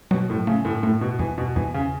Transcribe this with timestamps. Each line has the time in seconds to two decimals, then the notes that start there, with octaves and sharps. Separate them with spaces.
0.11 B2 F#3
0.30 A2
0.47 C#3 A3
0.65 A2
0.83 A2 A3
1.01 B2
1.19 E2 E3
1.38 B2
1.56 E2 E3
1.74 C#3